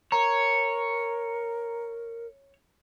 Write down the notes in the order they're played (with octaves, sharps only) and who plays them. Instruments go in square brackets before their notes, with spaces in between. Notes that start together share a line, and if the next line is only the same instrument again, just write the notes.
[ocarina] A#4 [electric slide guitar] C#5 [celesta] A#5